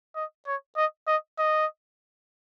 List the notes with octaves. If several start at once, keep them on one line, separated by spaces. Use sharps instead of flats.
D#5
C#5
D#5
D#5
D#5